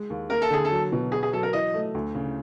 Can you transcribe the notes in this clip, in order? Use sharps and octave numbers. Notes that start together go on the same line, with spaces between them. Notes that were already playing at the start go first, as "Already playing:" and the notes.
Already playing: G#3
D#2
A#3 A#4
A4
D3 G#4
A4
F#3
B2
B3 G#4
G#4
F#3 A4
A#4
E3 D#5
A3
D2
C#3